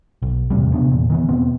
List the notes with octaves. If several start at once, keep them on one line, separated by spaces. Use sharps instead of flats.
B1
E2 A2 C3 G3
C3 B3 D4
E2 A#2
D#3 E3 B3
E2 B2 B3 C4